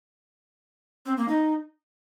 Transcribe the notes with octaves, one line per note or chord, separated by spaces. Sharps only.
C4
A#3
D#4